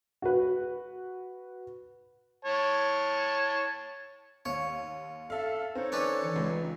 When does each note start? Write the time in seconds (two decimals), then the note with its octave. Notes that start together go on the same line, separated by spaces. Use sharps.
0.22 F#4 B4
2.45 C#5 A5
4.45 D#2 C#5
5.30 A4 E5 F5
5.75 C4 D#4 A4 C#5
5.92 C#4 D4 B4
6.24 E3
6.36 C#2